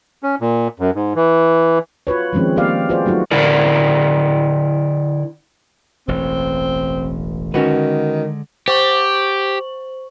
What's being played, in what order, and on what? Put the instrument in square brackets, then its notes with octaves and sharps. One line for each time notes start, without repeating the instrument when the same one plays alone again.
[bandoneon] C#4
A#2
F#2
G#2
E3
[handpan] F4 F#4 B4 C#5
D#3 F3 G#3 C4 C#4
A#3 B3 G4 D5 F5
F4 F#4 G#4 B4 C5 D5
F#3 A3 D#4 F4 F#4
[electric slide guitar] D3 E4 A#4 D5
[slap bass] E1 A1 [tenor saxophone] C4
[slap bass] D3 G#3 [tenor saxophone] D#3 [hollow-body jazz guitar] C#4 F#4 B4
[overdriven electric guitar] G4 [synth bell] C5 C#6 F#7